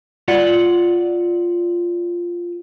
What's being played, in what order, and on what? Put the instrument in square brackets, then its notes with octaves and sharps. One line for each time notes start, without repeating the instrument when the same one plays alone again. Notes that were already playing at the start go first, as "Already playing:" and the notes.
[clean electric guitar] F4 D5 F#5